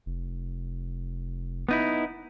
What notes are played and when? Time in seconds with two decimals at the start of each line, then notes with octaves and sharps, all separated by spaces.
0.06 F1
1.69 B3 D#4 E4